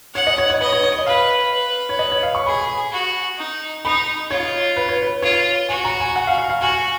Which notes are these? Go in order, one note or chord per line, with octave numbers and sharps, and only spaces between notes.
C#5 F#5
D#5
C#5
C#5
B4 D#5
C#5
C#5
D#5
B4 F5
B4
C#5
D#5
C#5
F5
C#6
G#4 B5
B5
F#4
D#4
D#4 B5
F4 C#5
B4
C#5
B4
F4 C#5
F#4 G#5
A#5
G#5
F#5
F5
F5
F5
F#4 G#5